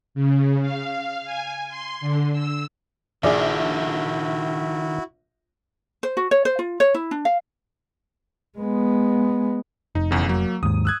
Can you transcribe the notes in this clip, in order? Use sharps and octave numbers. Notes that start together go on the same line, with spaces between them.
C#3
F5
G#5
C6
D3
E6
A#1 D#3 D4 E4 F#4 G#4 D5 E5
C5
F#4
C#5
C5
F4
C#5
E4
D4
F5
G#3 B3
F1 D#4
B1 E2 C#3
F#3 A#3
D#2 G#2 D#6
E6 F#6 G#6